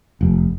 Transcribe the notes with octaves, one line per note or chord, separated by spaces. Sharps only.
F1